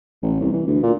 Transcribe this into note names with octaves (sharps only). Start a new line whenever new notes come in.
A1
C2
E3
D2
A#2